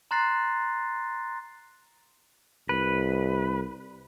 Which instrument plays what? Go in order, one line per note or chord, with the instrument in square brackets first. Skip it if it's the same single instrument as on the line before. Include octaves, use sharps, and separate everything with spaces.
[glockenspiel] A#5 C6 F#6 A6 A#6 C7
[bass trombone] C2 [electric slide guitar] B4